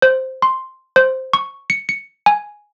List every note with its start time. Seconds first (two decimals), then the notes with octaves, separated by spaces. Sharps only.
0.02 C5
0.42 C6
0.96 C5
1.33 C#6
1.70 C#7
1.89 C#7
2.26 G#5